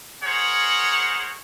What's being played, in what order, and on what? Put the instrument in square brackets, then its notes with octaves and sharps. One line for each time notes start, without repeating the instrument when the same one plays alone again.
[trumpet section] G#4 A#4 C5 C#5 F#5